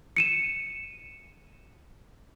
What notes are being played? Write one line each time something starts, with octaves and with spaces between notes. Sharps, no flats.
C#7 D#7 E7